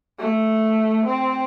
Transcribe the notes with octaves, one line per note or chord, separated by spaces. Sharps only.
A3
C4